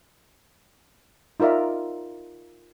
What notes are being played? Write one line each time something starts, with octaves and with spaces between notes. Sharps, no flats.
D#4 F4 A#4 D5 E5